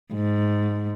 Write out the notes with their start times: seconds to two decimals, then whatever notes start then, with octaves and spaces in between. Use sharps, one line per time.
0.14 G#2